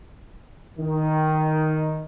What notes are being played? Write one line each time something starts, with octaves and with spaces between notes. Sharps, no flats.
D#3